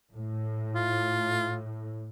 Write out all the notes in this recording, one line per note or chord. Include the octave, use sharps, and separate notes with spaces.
A2
F4